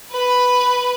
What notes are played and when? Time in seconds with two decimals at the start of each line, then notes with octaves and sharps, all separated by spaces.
0.12 B4 B5